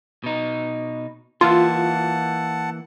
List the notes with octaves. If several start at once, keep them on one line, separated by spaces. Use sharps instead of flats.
B2 D#4
E3 A#3 F4 F#5 A5